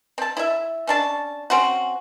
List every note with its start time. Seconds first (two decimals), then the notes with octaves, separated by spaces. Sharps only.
0.18 C4 A5
0.37 E4 E5
0.87 C#4 D4 A5
1.50 C4 C#4 F#4